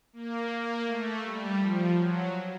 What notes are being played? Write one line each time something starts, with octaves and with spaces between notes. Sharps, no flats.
A#3
A#3
A3
G3
F3
F#3